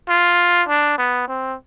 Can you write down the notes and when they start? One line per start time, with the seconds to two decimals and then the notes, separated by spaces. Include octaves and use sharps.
0.09 F4
0.68 D4
0.98 B3
1.28 C4